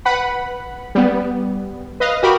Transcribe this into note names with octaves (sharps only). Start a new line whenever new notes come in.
B4 F#5 B5
G3 B3
B4 D#5 F5
F#4 G4 A#4 B5